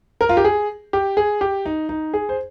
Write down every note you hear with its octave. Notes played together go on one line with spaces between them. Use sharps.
A#4
F4
G4
G#4
G4
G#4
G4
D#4
D#4
G#4
C5